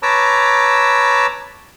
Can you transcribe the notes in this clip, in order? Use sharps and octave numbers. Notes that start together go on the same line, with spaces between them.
B4 C#5 A5 A#5 D6 E6